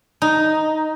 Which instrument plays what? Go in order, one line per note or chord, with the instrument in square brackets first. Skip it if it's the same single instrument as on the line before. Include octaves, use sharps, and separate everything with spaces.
[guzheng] D#4